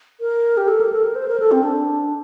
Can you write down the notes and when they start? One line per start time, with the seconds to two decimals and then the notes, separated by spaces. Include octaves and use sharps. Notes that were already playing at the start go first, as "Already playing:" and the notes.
0.21 A#4
0.57 G4
0.68 A4
0.81 A#4
0.92 A4
1.04 A#4
1.16 C5
1.28 A#4
1.40 A4
1.52 C4
1.63 D4